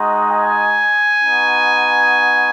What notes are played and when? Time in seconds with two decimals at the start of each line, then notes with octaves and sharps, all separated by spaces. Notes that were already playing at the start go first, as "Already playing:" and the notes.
Already playing: G#3 D#4 F#4
0.30 G#5
1.24 B3 D#4 F#4